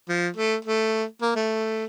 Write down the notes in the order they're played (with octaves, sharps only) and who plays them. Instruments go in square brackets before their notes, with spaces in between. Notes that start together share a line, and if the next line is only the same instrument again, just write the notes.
[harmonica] F3
A3
A3
A#3
A3